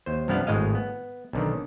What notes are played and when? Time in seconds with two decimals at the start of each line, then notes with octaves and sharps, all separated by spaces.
0.06 D#2 C5
0.28 C2 G2 F3 B3 D4 F5
0.47 G#1 A2 G#3 D#5 F5
0.75 B3
1.33 B1 D3 D#3